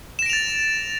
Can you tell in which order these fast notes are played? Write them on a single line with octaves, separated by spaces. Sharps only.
E7 A#6 D7 F7 A6